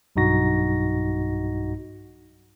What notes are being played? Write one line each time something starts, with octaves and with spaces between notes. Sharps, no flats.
B1 G2 D#4 F#4 A#6